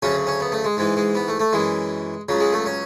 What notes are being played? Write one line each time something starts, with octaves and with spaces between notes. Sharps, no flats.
D2 C#3 F#3 C#4
C#4
B3
A3
G#3
G#2 E3 G#3
G#3
B3
A3
A3
F#2 E3 G#3
C#2 C#3 F#3
G#3
A3
C#4